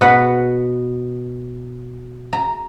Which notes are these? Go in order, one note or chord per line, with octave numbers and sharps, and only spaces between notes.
B2 B4 F#5
A#5